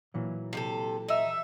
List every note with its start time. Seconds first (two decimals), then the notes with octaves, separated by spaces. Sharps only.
0.14 A#2 E3 F#3
0.53 C3 G4 A4
1.08 D#4 E5